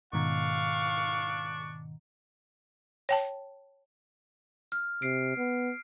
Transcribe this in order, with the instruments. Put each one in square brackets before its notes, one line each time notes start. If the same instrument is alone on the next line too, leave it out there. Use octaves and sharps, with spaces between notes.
[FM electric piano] G#2 B2 D#3 [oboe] D4 [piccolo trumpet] F5 [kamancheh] C#6
[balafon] C#5 G5 A5
[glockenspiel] F6
[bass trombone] C3 [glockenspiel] C7 D7
[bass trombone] B3